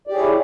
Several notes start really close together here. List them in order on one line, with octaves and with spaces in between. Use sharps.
D5 G4 G#4 C#5 E4